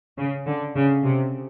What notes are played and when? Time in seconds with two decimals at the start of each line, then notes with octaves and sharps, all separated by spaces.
0.18 C#3
0.46 D3
0.75 C#3
1.03 C3